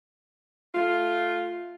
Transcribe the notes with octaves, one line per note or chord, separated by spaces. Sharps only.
A3 F4